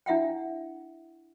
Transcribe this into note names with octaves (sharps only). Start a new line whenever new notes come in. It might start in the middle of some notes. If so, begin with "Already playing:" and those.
D4 E4 E5 F#5 G5